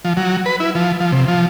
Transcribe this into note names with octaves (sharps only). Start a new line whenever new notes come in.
F3
F#3
B4
E4
F3
F3
C3
F3